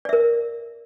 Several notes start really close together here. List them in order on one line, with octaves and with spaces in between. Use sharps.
D5 E5 A#4